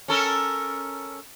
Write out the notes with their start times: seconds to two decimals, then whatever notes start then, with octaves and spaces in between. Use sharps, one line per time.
0.08 C#4 A4 A#4